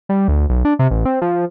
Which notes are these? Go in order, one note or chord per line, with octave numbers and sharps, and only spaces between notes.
G3
D2
B1
D4
C3
A1
C4
F3